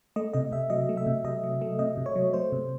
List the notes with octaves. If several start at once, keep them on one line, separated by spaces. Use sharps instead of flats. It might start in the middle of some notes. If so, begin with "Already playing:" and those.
A3 D#5
C3 D#5
C3 E5
F#3 D#5
A3
E5
C3
C3 D#5
F#3
A3
C3 D#5
C3
C#5
F#3
A3 C5
C3